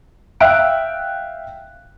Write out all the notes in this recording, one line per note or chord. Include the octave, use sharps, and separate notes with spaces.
E5 F5 G5 E6 F#6 D7